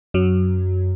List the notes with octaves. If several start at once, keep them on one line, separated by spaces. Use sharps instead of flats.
F#2 F#3